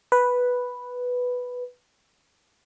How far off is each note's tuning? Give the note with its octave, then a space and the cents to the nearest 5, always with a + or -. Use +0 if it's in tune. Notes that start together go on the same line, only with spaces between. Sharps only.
B4 +0